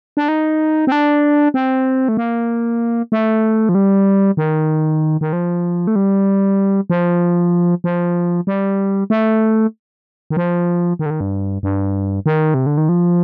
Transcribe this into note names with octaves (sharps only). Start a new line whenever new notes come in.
D4
D#4
C4
D4
C4
A3
A#3
A3
F3
G3
D#3
D#3
F3
A3
G3
F3
F3
G3
A3
D#3
F3
D#3
D3
D#3
G2
G2
D#3
C3
D3
D#3
F3